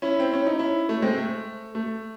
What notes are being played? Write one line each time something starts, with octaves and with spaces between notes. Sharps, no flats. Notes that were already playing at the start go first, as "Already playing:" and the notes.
C#4 E4
C4
C#4
D#4
C#4 E4
A3
G#3 C4
A3
A3